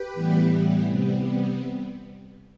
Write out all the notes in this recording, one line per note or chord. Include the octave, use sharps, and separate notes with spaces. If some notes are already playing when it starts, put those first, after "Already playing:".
Already playing: G4 B4
A2 E3 G3 B3
C3 G3 B3